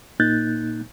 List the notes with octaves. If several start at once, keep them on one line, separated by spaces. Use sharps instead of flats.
A#2 A#3 D#4 F#6 G6 A6